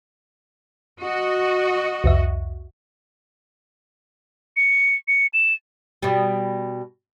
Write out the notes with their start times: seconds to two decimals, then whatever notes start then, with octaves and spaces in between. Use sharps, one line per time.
1.01 F#4 D#5
2.04 C2 F2 E5
4.56 C#7
5.08 C#7
5.33 E7
6.02 B2 G3